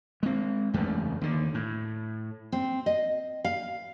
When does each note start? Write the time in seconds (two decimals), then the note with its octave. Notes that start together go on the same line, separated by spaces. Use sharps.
0.23 G#3 C4
0.74 F#1 E2 C#3 A3
1.21 D#2 D3
1.54 A2
2.52 C4
2.86 D#5
3.44 F5